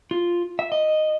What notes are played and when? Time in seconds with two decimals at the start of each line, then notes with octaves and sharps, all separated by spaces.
0.11 F4
0.59 E5
0.72 D#5